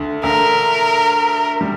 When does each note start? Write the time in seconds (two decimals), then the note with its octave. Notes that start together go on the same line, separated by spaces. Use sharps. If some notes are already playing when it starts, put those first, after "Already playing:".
Already playing: D2 D3
0.23 D2 D3 A#4
1.61 G3